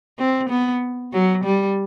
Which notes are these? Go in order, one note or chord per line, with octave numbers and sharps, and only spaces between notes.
C4
B3
F#3
G3